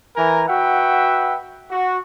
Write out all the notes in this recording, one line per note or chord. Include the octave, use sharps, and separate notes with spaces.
E3 A#4 G#5 A#5
F#4 B4 E5 F#5 G5
F#4